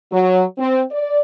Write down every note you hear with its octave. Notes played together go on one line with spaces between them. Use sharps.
F#3
C4
D5